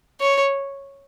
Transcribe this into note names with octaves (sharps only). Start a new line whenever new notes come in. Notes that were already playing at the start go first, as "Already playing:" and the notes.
C#5